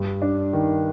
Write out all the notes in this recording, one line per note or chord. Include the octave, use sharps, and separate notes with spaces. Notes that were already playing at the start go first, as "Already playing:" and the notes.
Already playing: G2
D4
D#3